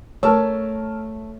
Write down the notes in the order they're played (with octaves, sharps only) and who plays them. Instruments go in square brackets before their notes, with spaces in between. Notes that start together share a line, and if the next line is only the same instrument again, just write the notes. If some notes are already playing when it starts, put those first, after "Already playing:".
[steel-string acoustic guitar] A3 [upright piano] A#4 A5 E6 [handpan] C#5